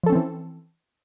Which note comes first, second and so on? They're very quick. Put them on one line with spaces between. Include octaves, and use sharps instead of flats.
F3 A4 C#4 C4 E3